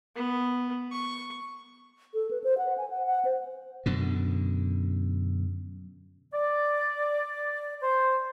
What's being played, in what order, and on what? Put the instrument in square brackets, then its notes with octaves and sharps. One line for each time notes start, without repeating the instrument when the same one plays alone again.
[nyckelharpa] B3
C#6
[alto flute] A4
B4
C5
F#5
G#5
F#5
F#5
C5
[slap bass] F#2 B2 D3
[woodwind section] D5
C5